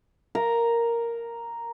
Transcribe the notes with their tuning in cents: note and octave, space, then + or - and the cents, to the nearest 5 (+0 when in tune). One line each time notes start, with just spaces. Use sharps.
A#4 +0 A#5 +0